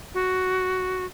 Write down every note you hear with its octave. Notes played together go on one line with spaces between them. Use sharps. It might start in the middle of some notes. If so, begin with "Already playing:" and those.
F#4